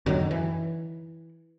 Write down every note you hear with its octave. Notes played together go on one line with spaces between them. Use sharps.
F#2 D3 D#3 F#3
E3